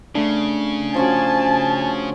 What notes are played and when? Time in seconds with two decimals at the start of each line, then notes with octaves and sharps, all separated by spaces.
0.15 C#3 A3 D4
0.94 F3 C#4 F#4 G#5 A5